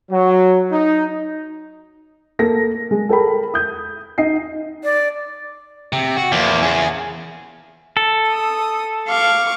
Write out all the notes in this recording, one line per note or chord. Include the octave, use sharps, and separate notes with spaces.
F#3
D#4
A#3 A4 A#6
G#3
A4 A#4 G5 B5
D#6 G6
D#4 D#5 C7
D5
C3
F#4
E2 F3 A#3
C#4 G#4
A4
D#6
F5 C#6 D6